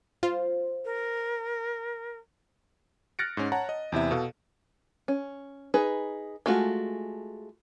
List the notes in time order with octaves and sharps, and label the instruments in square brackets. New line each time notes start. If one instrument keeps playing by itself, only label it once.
[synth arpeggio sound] F4 [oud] C5
[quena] A#4
[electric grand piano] F6 F#6 A6 A#6 C#7 D7
G#2 C#4
C#5 F#5 A5 A#5
D#5
E2 C3 E4 E5
B2 A4 F5
[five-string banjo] C#4
D#4 G#4 B4
G#3 A3 F4 F#4